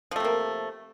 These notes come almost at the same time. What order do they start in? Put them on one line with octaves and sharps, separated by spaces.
F3 A3 C3 A#3